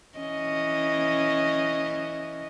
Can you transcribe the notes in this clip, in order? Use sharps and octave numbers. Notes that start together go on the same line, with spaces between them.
E3 C#4 D#5